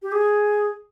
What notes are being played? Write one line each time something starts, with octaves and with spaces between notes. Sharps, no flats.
G4
G#4